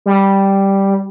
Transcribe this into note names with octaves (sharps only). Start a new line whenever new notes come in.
G3